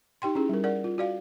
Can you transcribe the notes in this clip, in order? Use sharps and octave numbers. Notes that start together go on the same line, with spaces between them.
D#4 G4 G5 C6
C#4 E4 G#4
G3 A#4
A#4 D5 F#5
F4
F#4 D5 F5